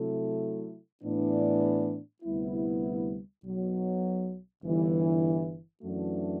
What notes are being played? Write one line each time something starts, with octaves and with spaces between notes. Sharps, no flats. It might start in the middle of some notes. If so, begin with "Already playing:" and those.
Already playing: C3 F#3 A3 E4 A4
A2 E3 B3 D4
D2 C3 G3 B3 E4
B1 B2 F#3
G1 G2 E3
F#2 E3 A3 D4 F#4